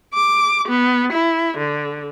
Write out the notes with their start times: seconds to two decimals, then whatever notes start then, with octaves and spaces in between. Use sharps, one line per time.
0.14 D6
0.68 B3
1.12 E4
1.58 D3